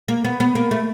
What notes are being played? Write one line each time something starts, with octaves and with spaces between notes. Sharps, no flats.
A#3
B3
B3
A#3
A3